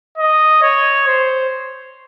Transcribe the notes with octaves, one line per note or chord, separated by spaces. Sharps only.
D#5
C#5
C5